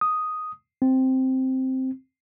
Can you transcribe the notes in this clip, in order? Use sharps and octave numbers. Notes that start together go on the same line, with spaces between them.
D#6
C4